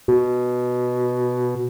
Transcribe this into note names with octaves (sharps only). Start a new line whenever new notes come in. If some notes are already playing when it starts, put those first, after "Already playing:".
B2